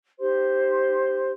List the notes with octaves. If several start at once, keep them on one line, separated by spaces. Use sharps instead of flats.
D#4 G4 C5 C6